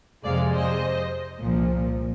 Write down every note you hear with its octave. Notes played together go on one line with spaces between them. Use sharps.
F2 C3 F3 G#3 D5 F5
C5 D#5
C2 A#2 F3